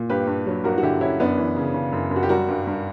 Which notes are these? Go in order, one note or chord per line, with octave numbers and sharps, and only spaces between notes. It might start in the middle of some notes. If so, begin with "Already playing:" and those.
Already playing: A#2
G2 G4 B4
G2
F#3
G2 F#4 A#4
F#4
D3 E4 G4
D3 C#4 E4
F#2 B3 D4
E3
C#3
C#3
F#2
F#2
F#4
G4
G3 F#4 A#4
G2
G2